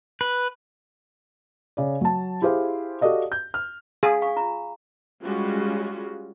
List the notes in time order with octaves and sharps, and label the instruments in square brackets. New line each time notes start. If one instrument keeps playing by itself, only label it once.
[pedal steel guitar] B4
[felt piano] C#3 D5
F#3 A5
E4 G4 G#4 C5 F5
F#4 G4 A4 D5 D#5 F5
G6
F6
[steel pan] G#4 [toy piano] F5 G#5
[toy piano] F5 G#5 C#6
F4 A#5
[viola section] G3 G#3 C#4 F4 F#4